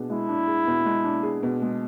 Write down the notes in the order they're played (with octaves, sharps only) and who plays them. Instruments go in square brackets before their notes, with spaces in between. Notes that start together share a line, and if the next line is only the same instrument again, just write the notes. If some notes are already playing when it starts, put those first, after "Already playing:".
Already playing: [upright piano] B2 D4 G#4
[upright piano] G#3 [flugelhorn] E4
[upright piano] D4
G#4
B2
G#3
D4
G#4
B2
G#3